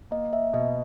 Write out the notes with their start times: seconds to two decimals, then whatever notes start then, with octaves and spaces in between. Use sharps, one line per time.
0.11 A#3 D#5
0.33 E5
0.53 B2 D#5